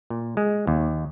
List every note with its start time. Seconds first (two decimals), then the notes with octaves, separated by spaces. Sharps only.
0.10 A#2
0.37 G#3
0.67 D#2